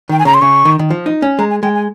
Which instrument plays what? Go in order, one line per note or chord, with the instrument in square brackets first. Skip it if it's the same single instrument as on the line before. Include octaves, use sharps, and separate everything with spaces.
[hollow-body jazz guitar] D#3 [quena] G5
[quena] G#5
[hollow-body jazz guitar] C#3 [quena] A#5
[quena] C6
[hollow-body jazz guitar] C#3 [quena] C#6
[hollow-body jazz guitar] D#3
D#3
F3
D#4
C#4
[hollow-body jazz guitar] G#3 [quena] A#5
[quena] G#5
[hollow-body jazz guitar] G#3 [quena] G5
[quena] G#5